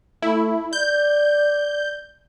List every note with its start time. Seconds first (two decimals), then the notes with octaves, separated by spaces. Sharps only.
0.22 A3 E4
0.73 D5 G6